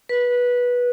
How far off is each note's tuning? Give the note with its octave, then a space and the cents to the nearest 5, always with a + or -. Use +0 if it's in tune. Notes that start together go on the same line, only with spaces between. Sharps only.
B4 -15